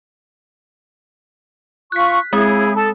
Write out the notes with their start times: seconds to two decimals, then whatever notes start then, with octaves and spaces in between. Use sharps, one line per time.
1.92 F4 C#6 F#6 B6
2.33 G#3 C4 E4 G#4 D#6
2.74 A4